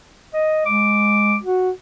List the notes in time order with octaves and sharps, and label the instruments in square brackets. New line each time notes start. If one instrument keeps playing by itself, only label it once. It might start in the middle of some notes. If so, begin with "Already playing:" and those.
[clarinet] D#5
[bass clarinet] G#3 [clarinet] D6
[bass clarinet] F#4